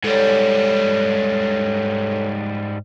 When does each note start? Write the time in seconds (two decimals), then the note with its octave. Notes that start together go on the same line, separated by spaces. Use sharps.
0.04 G#2 G3 A4 C#5